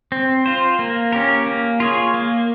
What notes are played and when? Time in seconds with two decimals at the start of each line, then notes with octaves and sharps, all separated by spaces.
0.12 C4
0.46 F4 C5
0.79 A#3
1.13 C#4 G4 A#4
1.46 A#3
1.80 F4 G#4 C#5
2.14 A#3